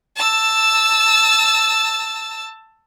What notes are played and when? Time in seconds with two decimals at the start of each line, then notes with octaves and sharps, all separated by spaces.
0.16 A5 E6